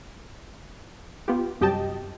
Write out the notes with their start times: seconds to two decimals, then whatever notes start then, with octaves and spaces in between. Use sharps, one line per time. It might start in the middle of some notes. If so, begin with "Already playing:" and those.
1.28 B3 F4 G4
1.61 C2 F#2 G4 D#5 G5 A5